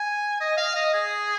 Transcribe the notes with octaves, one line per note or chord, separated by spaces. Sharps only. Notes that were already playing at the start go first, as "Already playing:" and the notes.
Already playing: G#5
D#5
F5
D#5
G#4